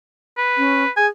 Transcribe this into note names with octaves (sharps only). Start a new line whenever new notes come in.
B4
C#4
G#4 G#5